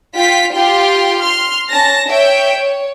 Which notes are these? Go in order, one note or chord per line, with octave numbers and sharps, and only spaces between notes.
F4 F5 G5 B6
F4 G4 G5 C6
C6 F6
C#4 A5 A#6
C#5 E5 G5
C#5